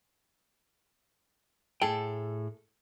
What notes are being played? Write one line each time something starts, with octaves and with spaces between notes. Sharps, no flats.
A2 G#4 A4 G5